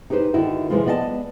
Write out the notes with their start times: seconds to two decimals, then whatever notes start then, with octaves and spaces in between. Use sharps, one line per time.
0.10 D#4 G4 G#4 B4 C5
0.34 D3 D#3 D#4 E4 F#4
0.70 C3 E3 F3 G#3 F4
0.86 B3 D5 D#5 F#5 A5